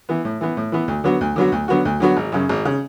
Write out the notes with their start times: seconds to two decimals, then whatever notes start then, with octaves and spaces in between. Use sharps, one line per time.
0.09 E3 B3
0.25 A2
0.41 E3 B3
0.57 A2
0.72 E3 B3
0.88 D2
1.04 D3 F#3 B3 F#4
1.21 D2
1.36 D3 F#3 B3 F#4
1.52 D2
1.68 D3 F#3 B3 F#4
1.85 D2
2.00 D3 F#3 B3 F#4
2.17 G#1
2.32 F#2 C#3
2.49 G#1
2.65 C#3